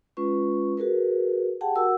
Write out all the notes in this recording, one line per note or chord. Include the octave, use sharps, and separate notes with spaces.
G#3 C#4 F4 B4 C#6
F#4 G#4 A#4 B4
G4 G#4 F#5 G5 A5
F#4 A#4 F#5 E6